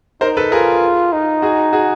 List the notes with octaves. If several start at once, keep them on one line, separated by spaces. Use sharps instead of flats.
D#4 A#4 C5
A4 B4
F4 G#4 A#4
D#4
F#4 G#4
F#4 G#4